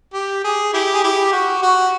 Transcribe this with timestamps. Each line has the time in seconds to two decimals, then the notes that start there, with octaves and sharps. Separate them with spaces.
0.14 G4
0.44 G#4
0.74 E4 G4
0.94 G#4
1.04 E4 G4
1.33 F#4
1.63 F#4